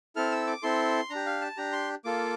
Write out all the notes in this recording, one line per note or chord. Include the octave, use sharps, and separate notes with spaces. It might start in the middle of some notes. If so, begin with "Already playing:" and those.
C4 E4 A4 F6
E6
D6
C4 E4 A4 C6
D4 A#5
G4
F5
A5
D4 G4 A#5
C6
A#3 F4 A4 D6